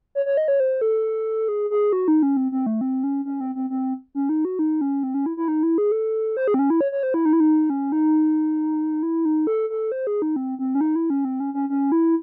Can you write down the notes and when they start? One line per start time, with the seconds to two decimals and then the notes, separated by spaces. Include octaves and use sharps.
0.15 C#5
0.26 C#5
0.37 D#5
0.48 C#5
0.60 C5
0.81 A4
1.48 G#4
1.70 G#4
1.93 F#4
2.08 D#4
2.23 C#4
2.37 C4
2.52 C4
2.66 A3
2.81 C4
3.04 C#4
3.25 C#4
3.41 C4
3.55 C4
3.70 C4
4.15 C#4
4.29 D#4
4.45 F#4
4.59 D#4
4.81 C#4
5.03 C4
5.14 C#4
5.26 E4
5.37 E4
5.48 D#4
5.63 E4
5.78 G#4
5.92 A4
6.37 C5
6.48 G#4
6.54 C4
6.59 C#4
6.70 E4
6.81 C#5
6.92 C#5
7.03 C5
7.14 E4
7.25 D#4
7.33 E4
7.40 D#4
7.70 C#4
7.92 D#4
9.03 E4
9.25 D#4
9.47 A4
9.70 A4
9.92 C5
10.07 G#4
10.22 D#4
10.36 C4
10.59 C4
10.75 C#4
10.81 D#4
10.96 E4
11.10 C#4
11.25 C4
11.40 C#4
11.54 C#4
11.70 C#4
11.92 E4